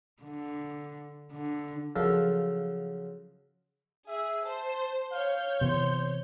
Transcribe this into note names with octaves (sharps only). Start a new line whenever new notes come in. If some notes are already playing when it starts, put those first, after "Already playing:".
D3
D3
C#3 F3 F#3 A4 A#4
G#4 E5
C5 A5
C#5 F5 G6
C3 E3 B3 C5